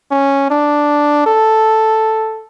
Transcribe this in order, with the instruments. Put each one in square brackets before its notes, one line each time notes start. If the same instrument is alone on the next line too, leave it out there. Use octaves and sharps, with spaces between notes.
[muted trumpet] C#4
D4
A4